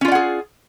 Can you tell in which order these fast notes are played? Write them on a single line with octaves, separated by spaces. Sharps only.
C#4 F4 D5 F#5 G#4